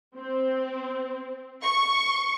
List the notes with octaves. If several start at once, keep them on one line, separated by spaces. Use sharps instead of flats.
C4
C#6